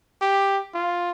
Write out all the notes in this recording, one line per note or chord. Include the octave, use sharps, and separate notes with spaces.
G4
F4